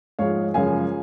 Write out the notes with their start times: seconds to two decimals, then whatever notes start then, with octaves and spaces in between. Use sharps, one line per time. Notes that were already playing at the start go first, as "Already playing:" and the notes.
0.19 G#2 F3 G#3 C#5 F5
0.54 F#2 C#3 F3 G#3 F5 G#5